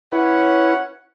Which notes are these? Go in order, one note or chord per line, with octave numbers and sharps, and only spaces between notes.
C#4 E4 B4 C#5 F#5